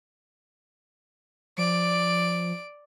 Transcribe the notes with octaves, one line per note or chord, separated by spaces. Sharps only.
F3 D5 D7